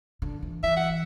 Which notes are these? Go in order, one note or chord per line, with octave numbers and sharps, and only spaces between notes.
D3
E3
E3 E5
F#5